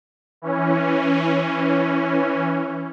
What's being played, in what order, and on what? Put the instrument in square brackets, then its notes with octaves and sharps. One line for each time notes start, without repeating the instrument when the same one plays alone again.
[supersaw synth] E3 C#4